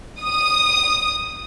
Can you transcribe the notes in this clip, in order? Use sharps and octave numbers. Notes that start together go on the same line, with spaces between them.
D#6